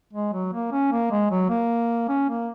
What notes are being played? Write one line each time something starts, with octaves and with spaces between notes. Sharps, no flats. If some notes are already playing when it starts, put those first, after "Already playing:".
G#3
F#3
A#3
C#4
A#3
G#3
F#3
A#3
C#4
A#3